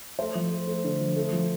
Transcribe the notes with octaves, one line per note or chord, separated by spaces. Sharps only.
A3 A4 C5
F3
A3
A3
D3
F3
A3
F3